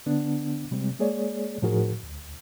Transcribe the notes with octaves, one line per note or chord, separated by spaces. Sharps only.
D3 B3 D4
C3 G3 G#3 C4
G#3 A#3 G#4 C#5 D5
A2 F3 D#4 F#4 G#4 A#4
D2